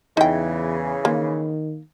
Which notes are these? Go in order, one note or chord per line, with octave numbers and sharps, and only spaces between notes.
E2 C#3 E3 D#4 G5
D#3 A#3